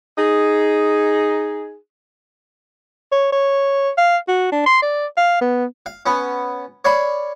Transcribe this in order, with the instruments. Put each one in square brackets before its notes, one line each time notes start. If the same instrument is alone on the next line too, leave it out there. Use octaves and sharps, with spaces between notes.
[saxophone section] D#4 G#4
[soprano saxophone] C#5
C#5
F5
F#4
D4
C6
D5
F5
B3
[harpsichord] F5
B3 C#4
C#5 D5 F5 B5